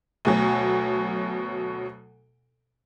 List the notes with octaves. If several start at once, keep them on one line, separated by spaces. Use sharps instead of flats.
D2 B2 F#3